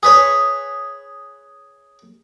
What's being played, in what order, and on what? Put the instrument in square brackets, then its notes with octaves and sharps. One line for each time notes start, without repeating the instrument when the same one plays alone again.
[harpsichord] G#4 B4 C#5